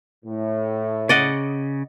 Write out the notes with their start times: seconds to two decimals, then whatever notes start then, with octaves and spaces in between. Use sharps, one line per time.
0.25 A2
1.09 C#3 D5 D#5 F#5